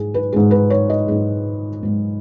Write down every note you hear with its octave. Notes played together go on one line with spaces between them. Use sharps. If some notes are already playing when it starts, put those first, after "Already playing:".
Already playing: G#2 G#4
B4
G#2 G#3 G#4
B4
C#5
D#5
G#2 G#3
G#2 G#3